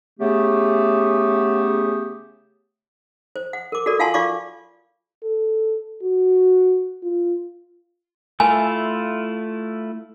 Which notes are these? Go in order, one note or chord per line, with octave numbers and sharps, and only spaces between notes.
C#3 A3 B3 G4
C5
F#5
A#4 D6
F#4 A4 A#4 D5
F4 F5 F#5 G#5 A5 C6
F4 D5 F5 C#6 D6
A4
F#4
F4
A3 E4 F4 G#5